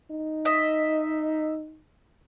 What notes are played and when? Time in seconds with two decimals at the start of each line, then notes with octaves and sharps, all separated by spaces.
0.11 D#4
0.45 D#5 E5